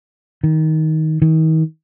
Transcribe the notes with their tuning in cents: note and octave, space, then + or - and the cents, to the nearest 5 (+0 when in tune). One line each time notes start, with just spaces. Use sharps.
D#3 +15
D#3 +40